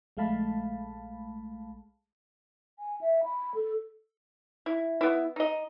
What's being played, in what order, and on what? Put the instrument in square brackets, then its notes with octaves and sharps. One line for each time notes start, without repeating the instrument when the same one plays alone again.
[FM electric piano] A#1 G#3 A3 F5 A5 B5
[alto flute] G#5
E5
B5
A4
[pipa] E4
B3 E4
D#4 D#5